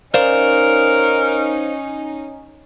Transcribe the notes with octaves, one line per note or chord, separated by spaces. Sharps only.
C#4 D#4 A#4 C5 D5 F5